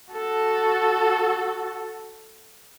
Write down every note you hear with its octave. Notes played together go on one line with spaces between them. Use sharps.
F#4 A4